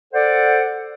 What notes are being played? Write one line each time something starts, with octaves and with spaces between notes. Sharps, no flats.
A4 C5 D5 F#5